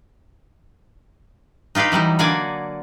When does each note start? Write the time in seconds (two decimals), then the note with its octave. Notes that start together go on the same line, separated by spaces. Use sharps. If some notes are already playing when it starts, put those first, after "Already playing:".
1.75 D#4 F4 G4 B4 F5
1.92 E3 F#3 G3 D#4
2.19 D3 A#3 D5 F#5 G#5